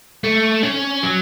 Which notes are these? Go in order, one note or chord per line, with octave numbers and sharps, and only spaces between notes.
A3
C#4
F#3